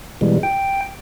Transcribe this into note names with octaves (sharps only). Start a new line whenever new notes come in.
B2 E3 G3 G#3
G5